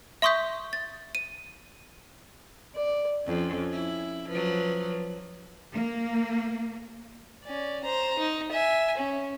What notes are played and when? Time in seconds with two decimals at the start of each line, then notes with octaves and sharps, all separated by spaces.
0.22 E5 C6 C#6 D#6 G6 B6
0.73 A6
1.15 D#7
2.75 D5
3.27 F2 C#4
3.72 E4
4.30 F3 F#3 B4
5.74 A#3
7.45 C#4 D5
7.84 C5 A#5
8.18 D#4
8.52 E5 G#5
8.97 C#4